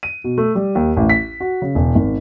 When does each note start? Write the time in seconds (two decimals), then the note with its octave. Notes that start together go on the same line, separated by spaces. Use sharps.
0.03 D#7
0.24 B2
0.38 A3
0.55 G3
0.75 D#2
0.97 A1
1.10 B6
1.40 F#4
1.62 C#3
1.75 E1
1.95 G#1